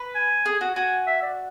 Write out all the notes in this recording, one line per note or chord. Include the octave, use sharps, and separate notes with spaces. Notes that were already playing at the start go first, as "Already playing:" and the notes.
Already playing: B4
G#5
G#4
F#4
F#4 G#5
E5
D5